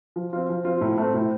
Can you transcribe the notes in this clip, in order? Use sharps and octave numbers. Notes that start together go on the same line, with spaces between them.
F3
C4 F4
F3
C4 F4
A2
A3 C4
A2